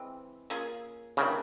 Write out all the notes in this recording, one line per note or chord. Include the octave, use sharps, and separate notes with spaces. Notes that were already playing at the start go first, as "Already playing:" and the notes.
Already playing: E3 G#3 C4
A#3 C#4 F4 G#4
C#3 E3 G3 A#3 D4